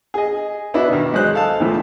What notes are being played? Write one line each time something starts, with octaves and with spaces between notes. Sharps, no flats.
G#4 D#5
B3 D4 E4 F#4
D#2 B2
F#3 G#3 C5 F#6
A4 F5 A5
C#2 A#2 E3 F3 A3